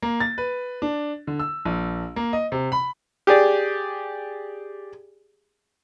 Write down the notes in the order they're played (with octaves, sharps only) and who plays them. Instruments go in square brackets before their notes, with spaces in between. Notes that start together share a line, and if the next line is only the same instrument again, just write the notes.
[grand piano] A#3
A6
B4
D4
D3
E6
A#1
A#3
D#5
C3
B5
[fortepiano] G4 G#4 D5